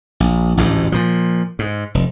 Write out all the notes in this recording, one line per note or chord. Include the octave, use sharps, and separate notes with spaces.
A#1
A1 D2 G#2
A#2 F3
G#2
F1